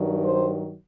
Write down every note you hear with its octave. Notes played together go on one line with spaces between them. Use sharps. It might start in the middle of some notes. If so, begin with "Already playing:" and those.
Already playing: G2 D#3 F#3
C5